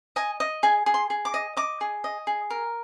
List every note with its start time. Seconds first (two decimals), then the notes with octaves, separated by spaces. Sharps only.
0.16 D#5 G#5
0.40 D#5
0.63 G#4 G#5
0.86 G#4
0.94 C6
1.10 G#4
1.25 D6
1.34 D#5
1.57 D#5 D6
1.81 G#4
2.04 D#5
2.27 G#4
2.50 A#4